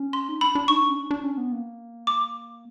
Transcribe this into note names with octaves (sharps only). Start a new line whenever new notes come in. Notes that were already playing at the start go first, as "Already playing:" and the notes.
Already playing: C#4
C6
D#4
D4 B5
D4
D#4 C#6
D4
C#4
D4
D4
C#4
B3
A#3
D6